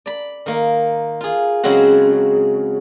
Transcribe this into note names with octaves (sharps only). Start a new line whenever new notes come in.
D5 B5
D#3 A#3
F4 G#4
C#3 F#3 G#3 C4 F#4